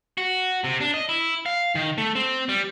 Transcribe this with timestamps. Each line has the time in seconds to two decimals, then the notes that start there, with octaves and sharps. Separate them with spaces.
0.18 F#4
0.64 C3
0.81 D4
0.94 D#5
1.09 E4
1.46 F5
1.75 D#3
1.98 A3
2.15 C4
2.49 G3